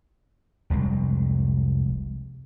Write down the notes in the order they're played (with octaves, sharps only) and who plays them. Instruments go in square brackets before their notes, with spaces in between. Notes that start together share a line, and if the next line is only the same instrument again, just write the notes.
[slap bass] F1 C2 G#3